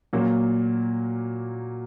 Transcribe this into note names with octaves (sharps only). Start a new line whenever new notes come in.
A#2 F#3 A#3